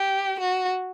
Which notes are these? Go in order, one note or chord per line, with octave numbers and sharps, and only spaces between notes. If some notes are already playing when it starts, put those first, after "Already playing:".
Already playing: G4
F#4